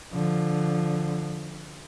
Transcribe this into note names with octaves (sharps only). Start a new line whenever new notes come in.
D3 F3